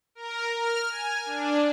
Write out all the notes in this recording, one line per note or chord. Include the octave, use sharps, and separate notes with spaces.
A#4
F6
G#5
D4